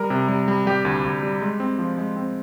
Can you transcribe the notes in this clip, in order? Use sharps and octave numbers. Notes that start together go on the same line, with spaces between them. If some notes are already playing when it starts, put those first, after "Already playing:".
Already playing: G3 A#4
C3
G3
G3
G3 G4
D2
D2
G3
G#3
C4
F3
G#3
C4